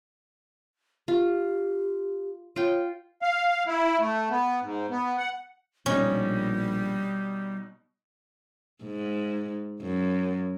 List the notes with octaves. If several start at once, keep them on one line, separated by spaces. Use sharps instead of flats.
F4 G4
F4 C#5 G5
F5
E4
A3
B3
G#2
B3
F#5
A#1 B2 G3 C#4 D#4
G#2
F#2